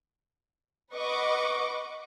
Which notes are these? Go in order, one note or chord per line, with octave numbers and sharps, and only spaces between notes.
B4 D#5 F#5 C#6 D6